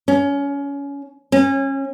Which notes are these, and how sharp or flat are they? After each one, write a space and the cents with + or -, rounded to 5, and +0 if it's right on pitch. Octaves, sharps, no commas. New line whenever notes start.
C#4 +25
C#4 -25